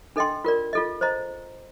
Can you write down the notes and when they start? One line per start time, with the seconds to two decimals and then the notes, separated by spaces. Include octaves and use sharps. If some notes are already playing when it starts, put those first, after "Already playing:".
0.16 D4 A4 D#5 G5 C6
0.44 F4 A#4 D5
0.73 F4 A4 D#5
1.01 C5 D#5 A#5